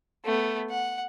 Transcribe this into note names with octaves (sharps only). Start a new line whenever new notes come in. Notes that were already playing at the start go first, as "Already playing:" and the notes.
A3 B3
F#5